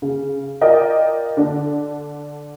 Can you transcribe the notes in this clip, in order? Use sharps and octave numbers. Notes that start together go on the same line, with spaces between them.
C#3
F4 A#4 D5 D#5 G5
D3 D4